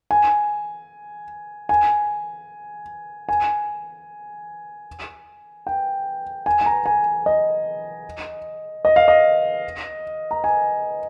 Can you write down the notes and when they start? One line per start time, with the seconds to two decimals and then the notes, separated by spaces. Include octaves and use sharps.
0.11 G#5
1.69 G#5
3.29 G#5
5.67 G5
6.46 G#5
6.61 G#5
6.66 A#5
6.86 G#5
7.26 D#5
8.85 D#5
8.96 F5
9.08 D#5
10.31 A#5
10.44 G#5